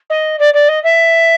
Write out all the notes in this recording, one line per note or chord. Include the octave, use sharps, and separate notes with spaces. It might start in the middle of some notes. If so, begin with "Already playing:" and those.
D#5
D5
D5
D#5
E5